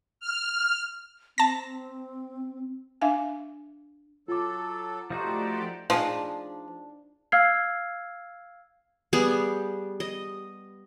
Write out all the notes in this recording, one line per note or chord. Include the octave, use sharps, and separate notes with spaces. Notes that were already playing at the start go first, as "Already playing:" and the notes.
F6
C4 A5 A#6
D4 E5 F5 G#5
F#3 F4 A4 D6
F3 A3 D#4 F#4 G4 C5 D5
F3 D4 D#4 G#4
F5 E6 F6 G#6 C7
G3 B3 G4 G#4
D#5